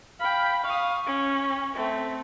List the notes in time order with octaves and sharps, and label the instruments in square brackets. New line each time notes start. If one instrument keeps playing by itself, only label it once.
[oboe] F5 [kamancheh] G5 B5
[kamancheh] F5 D#6 [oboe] C#6
[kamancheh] C#4
A3 C4